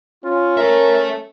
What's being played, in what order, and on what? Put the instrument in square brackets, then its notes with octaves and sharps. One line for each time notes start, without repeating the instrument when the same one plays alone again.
[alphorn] C#4 [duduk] F4
[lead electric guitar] A4 E5 [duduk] A#4